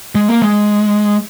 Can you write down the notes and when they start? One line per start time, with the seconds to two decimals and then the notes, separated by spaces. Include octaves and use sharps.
0.15 G#3
0.29 A#3
0.42 G#3